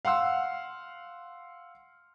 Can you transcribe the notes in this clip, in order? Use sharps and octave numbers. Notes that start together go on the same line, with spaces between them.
F5 F#5 C6 E6